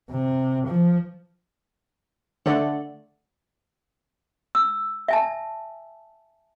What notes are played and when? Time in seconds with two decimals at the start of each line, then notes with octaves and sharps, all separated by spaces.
0.11 C3
0.68 F3
2.46 D3 A3 A4 D5 F#5
4.55 E6
5.08 E5 G#5 A5